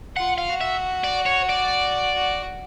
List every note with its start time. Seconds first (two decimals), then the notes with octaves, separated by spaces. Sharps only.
0.16 F4 F#5
0.38 F5
0.49 F#4
0.61 E5
1.04 D5
1.26 C#5
1.49 D5
2.14 F#4